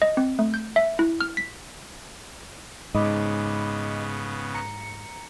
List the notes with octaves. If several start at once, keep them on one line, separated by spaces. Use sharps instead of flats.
D#5
C4
A3
G6
E5
E4
F6
B6
G#2 C#3 B3 D#5 B5 D6
A#5 C#7